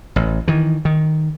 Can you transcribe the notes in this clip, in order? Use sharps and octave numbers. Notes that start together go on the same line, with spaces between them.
A1
D#3 E3
D#3